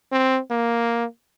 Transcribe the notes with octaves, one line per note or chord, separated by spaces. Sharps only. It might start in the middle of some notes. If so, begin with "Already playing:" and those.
C4
A#3